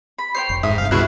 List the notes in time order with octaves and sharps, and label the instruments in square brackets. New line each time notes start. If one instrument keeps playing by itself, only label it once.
[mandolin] B5
[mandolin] C5 C#5 G5 [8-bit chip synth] C7
[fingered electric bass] F1
[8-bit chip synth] G#2 [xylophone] E5 [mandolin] D#6
[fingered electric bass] G2 C3 [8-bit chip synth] F5
[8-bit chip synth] C#2 B2 E4 [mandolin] F#4 G#4 F#6